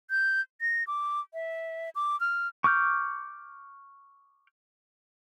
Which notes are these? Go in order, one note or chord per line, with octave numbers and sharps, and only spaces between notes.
G6
A#6
D6
E5
D6
F6
C#6 D6 F6 G6